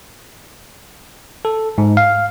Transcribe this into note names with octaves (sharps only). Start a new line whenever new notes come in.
A4
G#2
F5